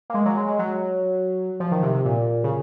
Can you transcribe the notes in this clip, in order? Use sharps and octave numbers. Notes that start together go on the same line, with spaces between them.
A#3
G#3
F#3
G#3
G#3
F#3
F3
D#3
C3
C3
A#2
C#3